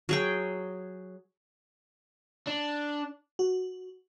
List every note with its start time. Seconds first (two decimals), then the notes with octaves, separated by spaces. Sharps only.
0.09 F#3 G#4 G5
2.47 D4
3.39 F#4